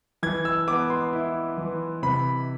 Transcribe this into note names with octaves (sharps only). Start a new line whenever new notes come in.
E3 G#6
E6
B3 D6
C6
E4
E3
C3 B5